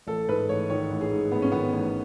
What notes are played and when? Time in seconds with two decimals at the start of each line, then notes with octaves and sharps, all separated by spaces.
0.07 A1 A4
0.28 G#2 B4
0.49 A1 C#5
0.70 D#3 C#5
0.91 A1
1.01 G#4
1.12 G#2
1.32 A1 B3
1.42 C#4
1.52 D#3 B3
1.73 A1